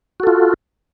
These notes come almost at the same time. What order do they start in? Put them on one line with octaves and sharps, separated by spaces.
F#4 A4 F4